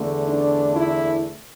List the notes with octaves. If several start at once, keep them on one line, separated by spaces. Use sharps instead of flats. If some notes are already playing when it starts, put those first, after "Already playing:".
Already playing: E2 D3 A3
D4
E4